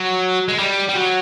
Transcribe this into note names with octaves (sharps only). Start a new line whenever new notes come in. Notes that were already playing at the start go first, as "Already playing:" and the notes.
Already playing: F#3
G#3
G3
G3
F#3